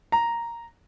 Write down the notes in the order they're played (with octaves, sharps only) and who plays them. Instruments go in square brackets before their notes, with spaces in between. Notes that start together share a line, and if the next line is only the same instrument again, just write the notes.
[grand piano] A#5